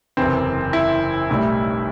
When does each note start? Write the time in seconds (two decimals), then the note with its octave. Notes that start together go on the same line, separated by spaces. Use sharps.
0.17 F#1 E2 C3 E3 C4
0.73 E4
1.30 B1 A2 G3